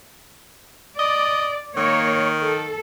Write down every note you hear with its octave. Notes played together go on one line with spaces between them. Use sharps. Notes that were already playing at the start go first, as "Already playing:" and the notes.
D5 D#5
D#3 A#3 C#5
A4